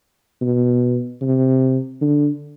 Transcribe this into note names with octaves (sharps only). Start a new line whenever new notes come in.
B2
C3
D3